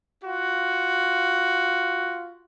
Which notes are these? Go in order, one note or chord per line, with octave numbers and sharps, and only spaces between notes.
F4 F#4